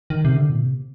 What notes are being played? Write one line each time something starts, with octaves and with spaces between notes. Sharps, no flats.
D#3
C3
D3
A#2
C3